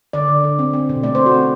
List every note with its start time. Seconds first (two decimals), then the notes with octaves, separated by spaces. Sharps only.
0.13 D3 D5
0.28 D3
0.44 D3
0.59 C4
0.73 C4
0.89 B2
1.03 A3 D5
1.15 C4 C5
1.26 F#4
1.34 C4